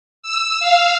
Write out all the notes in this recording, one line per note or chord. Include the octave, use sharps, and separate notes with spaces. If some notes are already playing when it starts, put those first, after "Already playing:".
E6
F5